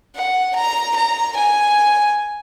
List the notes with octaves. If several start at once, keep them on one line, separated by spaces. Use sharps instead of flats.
F#5
A#5
A#5
G#5